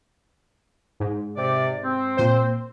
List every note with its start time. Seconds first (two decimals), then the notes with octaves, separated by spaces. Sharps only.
1.00 G#2
1.37 C3 D5
1.83 C4
2.17 A#2 C5